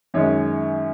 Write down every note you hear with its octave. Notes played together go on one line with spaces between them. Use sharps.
F#2 D#3 G#3 C#4 C#5